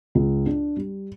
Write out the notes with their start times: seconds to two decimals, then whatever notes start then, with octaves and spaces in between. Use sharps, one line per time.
0.15 C#2
0.46 D4
0.77 G3